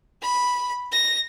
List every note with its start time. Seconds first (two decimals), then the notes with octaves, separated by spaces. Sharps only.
0.22 B5
0.91 A#6